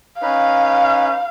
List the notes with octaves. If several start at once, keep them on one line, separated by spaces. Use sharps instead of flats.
C#4 D#4 B4 F5